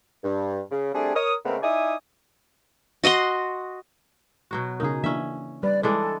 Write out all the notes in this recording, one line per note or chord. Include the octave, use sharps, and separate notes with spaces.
G2
C#3
G3 A3 C4 D4 G#4
A#4 C#5 D#6
C#3 G#3 A3 B3 C4 A#4
D#4 E4 D5 E5 G#5 D#6
F#4 D#5 F#5 C6
B2 F#3 F#4
C#3 B3 D#4 G#4 A#4
E3 A#3 C#4 D4 E5
G3 B4 D5
E3 G#3 D4 A4